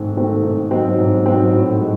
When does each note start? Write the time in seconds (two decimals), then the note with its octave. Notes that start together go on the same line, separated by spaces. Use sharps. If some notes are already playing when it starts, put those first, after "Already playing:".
Already playing: G#2 D#3 A3 C4
0.15 D#3 A3 C4
0.43 G#2
0.71 F#3 C4 D#4 F#4
0.99 G#2
1.25 F#3 C4 D#4 F#4
1.53 A2
1.81 G#3